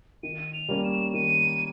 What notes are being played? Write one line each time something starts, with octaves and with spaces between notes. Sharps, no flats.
D#3 D#7
F7
G3 A#3 C#4
E7
D#3 D#7